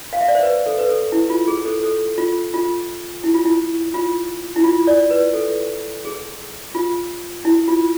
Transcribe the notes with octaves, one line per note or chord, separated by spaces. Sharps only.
F5
E5
D5
C5
B4
A4
B4
A4
E4
F4
G#4
A4
A4
F4
F4
E4
F4
E4
F4
E4
F4
D5
B4
A4
G#4
F4
E4
F4